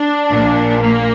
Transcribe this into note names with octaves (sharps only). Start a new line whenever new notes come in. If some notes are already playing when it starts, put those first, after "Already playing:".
Already playing: D4
A#1 A#2
A#3